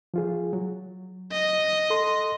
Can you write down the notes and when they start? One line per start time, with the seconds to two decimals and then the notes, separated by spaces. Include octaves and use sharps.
0.14 F3 F4 G#4
0.53 F#3
1.32 D#5
1.90 A4 C6